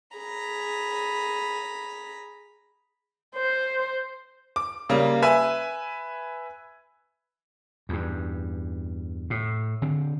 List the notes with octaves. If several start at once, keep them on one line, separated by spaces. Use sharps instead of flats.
G#4 A#5 B5
C5
D6
C#3 G3 A#3
B4 E5 G#5
E2 G2
A2
D3 C4